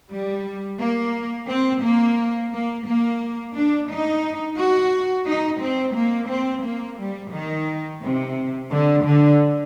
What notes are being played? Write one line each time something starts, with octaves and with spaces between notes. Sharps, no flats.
G3
A#3
C4
A#3
A#3
A#3
D4
D#4
F#4
D#4
C4
A#3
C4
A#3
G3
D#3
C3
D3
D3